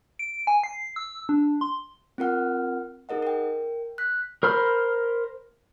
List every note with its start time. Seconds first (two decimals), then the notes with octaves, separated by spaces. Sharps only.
0.19 D7
0.47 G#5
0.64 C7
0.96 E6
1.29 D4
1.61 C6
2.18 C4 F4 A#4 F#5 F6
3.09 D#4 G#4 A#4 D#5 F#5
3.22 A#4 G5
3.98 F#6 B6
4.43 A#4 C5 B5 F6